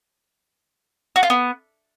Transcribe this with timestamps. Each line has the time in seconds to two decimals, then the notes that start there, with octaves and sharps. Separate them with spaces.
1.16 F#4
1.23 F4
1.30 B3